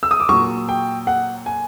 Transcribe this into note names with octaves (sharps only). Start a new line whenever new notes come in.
E6
D#6
D6
A#2 F#3 C#6
G5
F#5
G#5